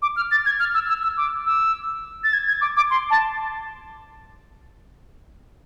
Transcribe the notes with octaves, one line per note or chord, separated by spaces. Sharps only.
D6
F6
A6
G#6
F6
E6
E6
E6
D6
E6
A6
G#6
G#6
D6
D6
C6
A5